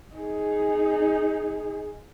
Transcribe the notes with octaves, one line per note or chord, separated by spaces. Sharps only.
D#4 G#4